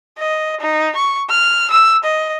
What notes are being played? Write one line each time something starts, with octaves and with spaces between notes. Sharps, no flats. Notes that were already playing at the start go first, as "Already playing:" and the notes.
D#5
D#4
C#6
F6
E6
D#5